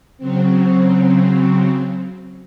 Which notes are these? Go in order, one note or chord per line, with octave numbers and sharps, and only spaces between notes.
C#3 F#3 C4